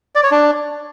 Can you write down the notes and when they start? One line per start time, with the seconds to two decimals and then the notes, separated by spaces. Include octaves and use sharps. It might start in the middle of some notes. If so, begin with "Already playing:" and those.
0.15 D5
0.23 C#5
0.31 D4